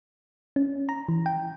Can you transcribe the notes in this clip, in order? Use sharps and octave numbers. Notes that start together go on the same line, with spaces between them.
C#4
A#5
E3
G5